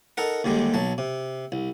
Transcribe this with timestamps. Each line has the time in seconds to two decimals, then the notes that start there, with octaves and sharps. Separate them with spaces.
0.17 D#4 A4 A#4 F#5
0.44 D#2 D3 G3 G#3
0.74 B1 F#3 A5
0.98 C3
1.52 C2